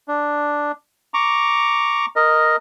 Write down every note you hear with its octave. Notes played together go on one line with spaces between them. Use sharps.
D4
A#5 C#6 D6
A#4 D#5